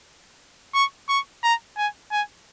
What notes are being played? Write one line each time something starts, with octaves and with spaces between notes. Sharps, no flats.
C#6
C#6
A#5
G#5
G#5